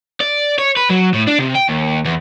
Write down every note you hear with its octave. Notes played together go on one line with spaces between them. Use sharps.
D5
C#5
B4
F#3
A2
D4
C3
G5
D#2
E2